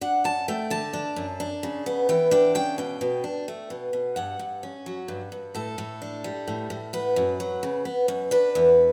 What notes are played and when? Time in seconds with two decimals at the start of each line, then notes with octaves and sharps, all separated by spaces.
0.01 D4 F#5
0.24 F#2 A5
0.48 A3 G5
0.70 D3 A5
0.93 D4
1.16 F#2
1.40 D4
1.63 C#3
1.86 B3
2.09 E3 G5
2.31 D4 G5
2.55 C#3 G5
2.78 B2 G5
3.01 B2
3.24 D4
3.48 A3
3.70 B2
3.93 B2
4.16 G2 F#5
4.39 G2
4.63 C#4
4.86 F#3
5.08 G2
5.32 G2
5.55 A2 A4
5.78 A2
6.02 D4
6.24 G3
6.47 A2
6.70 A2
6.93 B3 B4
7.16 F#2
7.40 F#3
7.63 C#3
7.85 B3
8.08 F#2
8.31 D4 B4
8.55 E2